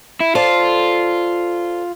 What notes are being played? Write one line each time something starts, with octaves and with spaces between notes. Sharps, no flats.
E4
F4 A4 C5 D5